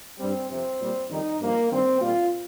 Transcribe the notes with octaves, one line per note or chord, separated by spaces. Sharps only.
G2 G3 C4
F2 C3 F3 C4
A#2 G3
F2 D#3 G3 D#4
G2 F3 A#3
G2 D#3 G3 C4
A#2 G3 F4